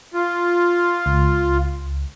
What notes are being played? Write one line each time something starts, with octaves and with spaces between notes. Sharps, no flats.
F4
C#2